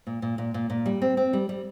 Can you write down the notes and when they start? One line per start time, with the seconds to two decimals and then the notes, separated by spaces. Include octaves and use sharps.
0.07 A#2
0.22 A#2
0.38 A#2
0.54 A#2
0.70 A#2
0.86 G3
1.02 C4
1.17 C4
1.33 G3
1.49 G3